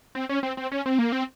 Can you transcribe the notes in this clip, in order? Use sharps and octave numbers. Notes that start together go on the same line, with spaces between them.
C4
C#4
C4
C4
C#4
C4
A#3
C4